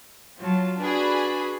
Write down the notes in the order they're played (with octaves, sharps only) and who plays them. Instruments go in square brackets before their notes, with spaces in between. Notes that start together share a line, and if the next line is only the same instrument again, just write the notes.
[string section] F#3 [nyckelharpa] F4 A5
[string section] D4 G#4 B5 [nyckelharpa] F#4 B4